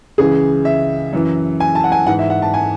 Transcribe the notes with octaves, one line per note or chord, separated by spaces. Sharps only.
C#2 C#3 E3 G#4
E5
F#2 E3
G#5
A5
F#5
G#5
G#2 E3 F#5
E5
F#5
A5
G#5